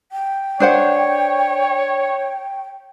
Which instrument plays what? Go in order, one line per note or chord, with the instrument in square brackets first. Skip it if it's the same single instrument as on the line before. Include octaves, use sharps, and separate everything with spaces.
[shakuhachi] G5
[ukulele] D4 C5 F#5 [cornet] C#5